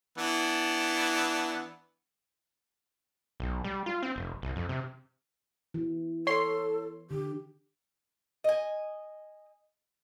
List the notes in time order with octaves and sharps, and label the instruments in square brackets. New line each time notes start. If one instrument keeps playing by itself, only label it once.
[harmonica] E3 B3 D4
[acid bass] B1
G3
F4
C4
F1
C2
F2
C3
[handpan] E3
[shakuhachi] A4 [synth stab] C#5 C6
[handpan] D3 [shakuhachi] G4
[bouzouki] D#5 G#5